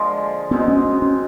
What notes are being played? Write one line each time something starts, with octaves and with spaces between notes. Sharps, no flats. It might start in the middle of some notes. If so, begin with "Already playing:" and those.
Already playing: D3 F3 G#3 A#3 D4
B2 G#3 B3 C4 D#4
C#4
C#4
C#4